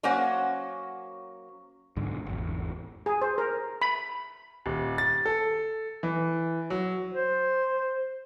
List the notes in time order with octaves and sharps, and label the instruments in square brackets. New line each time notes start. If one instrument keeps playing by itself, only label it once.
[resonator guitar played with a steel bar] F#3 A#3 C#4 C5 C#5 F#5
[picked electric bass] B1 G#2 D3
G#1 E2
[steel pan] G#4
C5
A#4
B5
[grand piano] D#1
A6
A4
E3
F#3
[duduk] C5